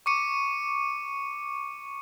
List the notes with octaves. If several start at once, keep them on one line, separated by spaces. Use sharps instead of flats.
C#6 D6 C#7 D#7